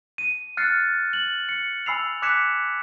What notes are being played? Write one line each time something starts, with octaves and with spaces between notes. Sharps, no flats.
D#7
F6 F#6 A6 C7 C#7
F#7
C#7
G#5 B5 E6 C7 F7
D6 F#6 G#6 B6 C#7 E7